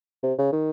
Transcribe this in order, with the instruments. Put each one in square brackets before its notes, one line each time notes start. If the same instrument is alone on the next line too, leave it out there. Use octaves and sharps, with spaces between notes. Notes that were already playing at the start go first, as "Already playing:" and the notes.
[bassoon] C3
C#3
D#3